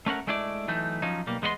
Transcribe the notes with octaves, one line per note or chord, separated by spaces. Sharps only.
A3 C#4 A#4 F#5
G#3 A3 D4 E4 D5
E3 F#3 A3 D#4
F3 F#3 C#4 D#4
B1 G3 A#3
E2 G#3 B3 E4 D#5 C6